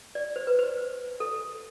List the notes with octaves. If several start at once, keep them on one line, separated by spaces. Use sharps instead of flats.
D5
C5
B4
C5
A4